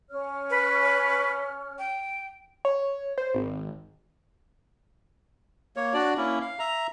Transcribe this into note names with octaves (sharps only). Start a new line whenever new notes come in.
C#4 C#5 F6
B4
G5
C#5
C5
G#1
A#3 C#5
D4 F#4 D5
A#3 C#4 E4
F5
E5 A#5